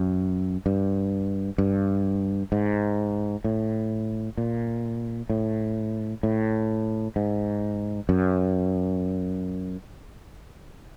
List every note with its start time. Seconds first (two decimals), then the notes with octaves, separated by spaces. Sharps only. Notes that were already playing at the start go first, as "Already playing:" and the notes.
Already playing: F#2
0.66 G2
1.58 G2
2.52 G#2
3.44 A2
4.37 A#2
5.30 A2
6.23 A2
7.16 G#2
8.09 F#2